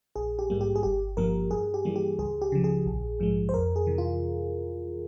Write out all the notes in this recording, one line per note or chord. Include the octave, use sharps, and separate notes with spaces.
A#1 G#4
G4
G#2 G3 A#3
G4
G#4
G1 G4
G2 F3 A#3 A#4
G2 G#4
G4
E3 G3 A#3
G4
C#2 G#4
G4
C#3 F3
G#4
A#1
G#2 F3 G#3
C5
F2 A#4
G#4
C3 E3
F4